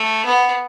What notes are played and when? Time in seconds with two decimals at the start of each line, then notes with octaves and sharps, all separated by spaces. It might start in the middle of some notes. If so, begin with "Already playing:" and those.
Already playing: A3
0.25 B3